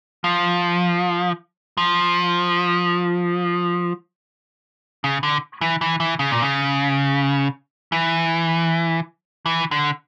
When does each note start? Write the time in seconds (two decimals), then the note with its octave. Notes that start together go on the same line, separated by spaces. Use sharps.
0.24 F3
1.77 F3
5.04 C#3
5.23 D3
5.61 E3
5.81 E3
6.00 E3
6.19 C#3
6.31 A#2
6.42 C#3
7.92 E3
9.46 E3
9.71 D3